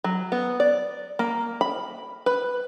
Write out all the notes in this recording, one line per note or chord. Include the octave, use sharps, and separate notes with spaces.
F#3
B3
D5
A#3
B5
B4